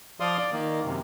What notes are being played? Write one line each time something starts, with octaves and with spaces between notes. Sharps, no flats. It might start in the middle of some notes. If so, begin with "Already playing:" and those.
F3 D5 F5 C6 D#6
D5
D#3 A#3
F#2 C3